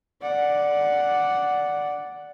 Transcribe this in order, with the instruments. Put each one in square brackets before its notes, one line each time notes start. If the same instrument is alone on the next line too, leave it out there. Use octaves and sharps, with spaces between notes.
[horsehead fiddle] D5 F#5